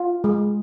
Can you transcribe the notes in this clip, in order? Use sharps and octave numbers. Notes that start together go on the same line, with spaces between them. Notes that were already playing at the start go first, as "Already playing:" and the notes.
Already playing: F4
G#3